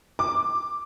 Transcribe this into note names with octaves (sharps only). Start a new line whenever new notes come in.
D6